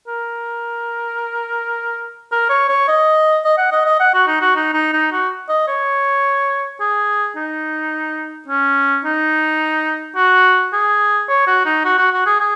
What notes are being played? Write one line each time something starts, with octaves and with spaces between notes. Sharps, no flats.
A#4
A#4
C#5
C#5
D#5
D#5
F#5
D#5
D#5
F#5
F#4
D#4
F#4
D#4
D#4
D#4
F#4
D#5
C#5
G#4
D#4
C#4
D#4
F#4
G#4
C#5
F#4
D#4
F#4
F#4
F#4
G#4
G#4